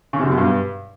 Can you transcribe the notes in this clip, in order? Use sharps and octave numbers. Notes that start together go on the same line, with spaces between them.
C#3
C3
F#2
B2
G2